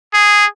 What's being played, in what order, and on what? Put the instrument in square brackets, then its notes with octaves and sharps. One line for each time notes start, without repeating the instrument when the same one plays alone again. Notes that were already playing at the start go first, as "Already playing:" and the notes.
[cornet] G#4